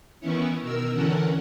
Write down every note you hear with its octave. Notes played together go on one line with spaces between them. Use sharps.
D#3 E3 B3 C#4 E4 C#5
B2 D#3 A#4 E6
D3 E3 C#4 A4 A#4 F#5